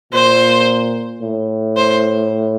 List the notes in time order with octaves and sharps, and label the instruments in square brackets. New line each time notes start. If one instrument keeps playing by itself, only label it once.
[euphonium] A#2 [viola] C5
[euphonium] A2
[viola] C5